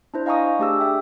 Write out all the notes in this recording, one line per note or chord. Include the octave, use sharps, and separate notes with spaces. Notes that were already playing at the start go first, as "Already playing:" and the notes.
D4 E4 C5
D#5 F5 G#5 A#5 C#6 D#6
A3 D4 G4 G#4 E6
G4 E5 G5 D6